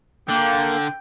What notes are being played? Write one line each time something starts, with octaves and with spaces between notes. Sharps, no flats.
D3 A#3 G5